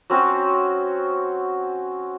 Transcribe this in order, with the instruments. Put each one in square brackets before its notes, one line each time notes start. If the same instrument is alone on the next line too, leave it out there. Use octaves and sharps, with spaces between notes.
[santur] F#3 C4 C#4 F#4